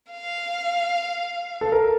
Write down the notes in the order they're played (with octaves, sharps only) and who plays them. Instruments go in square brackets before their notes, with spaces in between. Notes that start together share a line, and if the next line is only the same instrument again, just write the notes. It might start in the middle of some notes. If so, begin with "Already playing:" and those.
[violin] F5
[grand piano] A4
A#4